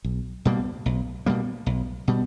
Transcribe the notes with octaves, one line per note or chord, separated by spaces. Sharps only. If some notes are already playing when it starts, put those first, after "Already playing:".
B1
B2 G3 A#3
B1
B2 G3 A#3
B1
B2 G3